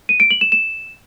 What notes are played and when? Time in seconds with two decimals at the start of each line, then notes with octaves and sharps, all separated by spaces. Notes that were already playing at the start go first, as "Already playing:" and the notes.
0.09 D#7
0.20 D7
0.31 F#7
0.41 E7
0.52 E7